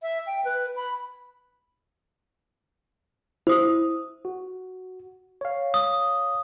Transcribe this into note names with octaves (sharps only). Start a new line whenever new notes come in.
E5
G5
B4
B5
E4 C5 D#6
F#4
C#5 F5
D#6